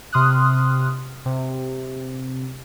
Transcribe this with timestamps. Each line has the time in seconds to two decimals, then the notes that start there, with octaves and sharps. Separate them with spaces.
0.12 C3 C6 D#6 F6 F#6
1.25 C3